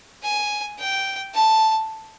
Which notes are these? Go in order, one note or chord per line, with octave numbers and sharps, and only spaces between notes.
G#5
G5
A5